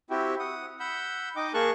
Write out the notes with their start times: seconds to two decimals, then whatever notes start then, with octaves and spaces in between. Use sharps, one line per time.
0.10 C4 E4 F#4 G4 G5
0.39 F#5 D#6
0.80 F#5 B5 E6 G6
1.36 D#4 D#5 G5 D6
1.54 A#3 G#4 A#4 A5 C#6 F#6